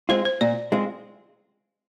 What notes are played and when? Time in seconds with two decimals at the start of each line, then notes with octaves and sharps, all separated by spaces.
0.09 G#3 C4 F4 C5
0.25 C5
0.41 A#2 D5
0.72 G#3 C4 F4